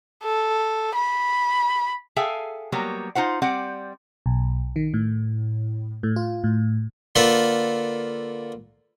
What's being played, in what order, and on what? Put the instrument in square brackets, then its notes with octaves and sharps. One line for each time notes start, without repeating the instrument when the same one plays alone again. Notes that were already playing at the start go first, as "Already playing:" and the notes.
[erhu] A4
B5
[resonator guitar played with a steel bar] G#4 A4 E5 F5 G5 G#5
F#3 G3 A#3 B3 A#4 C#5
D#4 F4 C5 F#5
G3 C4 D5 F#5
[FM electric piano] B1
D#3
A2
A2
F4
A2
[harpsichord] D3 A#3 F4 A4 B4